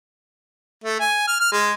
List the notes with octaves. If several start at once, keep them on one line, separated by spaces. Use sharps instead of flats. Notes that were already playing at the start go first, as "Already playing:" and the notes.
A3
G#5
F6
F6
G#3